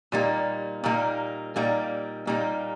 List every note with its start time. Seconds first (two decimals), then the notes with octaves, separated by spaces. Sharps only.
0.12 A#2 G3 A#3 D#4
0.84 A#2 G3 A#3 D#4
1.56 A#2 G3 A#3 D#4
2.27 A#2 G3 A#3 D#4